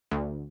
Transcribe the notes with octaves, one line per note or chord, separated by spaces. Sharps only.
D2